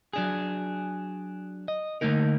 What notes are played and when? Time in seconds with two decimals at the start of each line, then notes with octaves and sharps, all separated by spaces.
0.13 F#3 D4 G#4
1.68 D#5
2.01 D3 A3 A#3 D#4 A#4